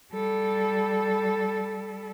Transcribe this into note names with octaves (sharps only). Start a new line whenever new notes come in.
G3 A4